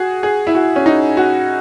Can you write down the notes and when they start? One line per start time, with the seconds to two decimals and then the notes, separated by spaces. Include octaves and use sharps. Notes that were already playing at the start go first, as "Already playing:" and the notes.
Already playing: F#4 G#4
0.23 G#4
0.47 E4
0.55 F#4
0.76 C#4
0.86 D#4
1.17 F#4